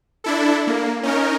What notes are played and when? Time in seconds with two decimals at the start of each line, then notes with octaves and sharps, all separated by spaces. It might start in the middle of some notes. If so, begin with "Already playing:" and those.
0.24 D4 E4 A4
0.67 A#3
1.03 C#4 D#4 A#4